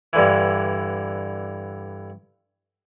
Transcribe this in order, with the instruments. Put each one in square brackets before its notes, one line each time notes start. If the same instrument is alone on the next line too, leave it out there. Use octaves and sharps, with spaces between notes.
[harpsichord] G2 D3 E3